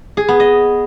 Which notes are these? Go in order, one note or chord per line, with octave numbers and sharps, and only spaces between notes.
G#4
B3
D#5